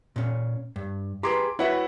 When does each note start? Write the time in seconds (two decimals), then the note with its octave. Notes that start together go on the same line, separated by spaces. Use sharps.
0.16 A#2 C#4
0.76 G2
1.23 G4 G#4 B4 A#5 C6 D6
1.59 E4 F#4 B4 C#5 E5 F#5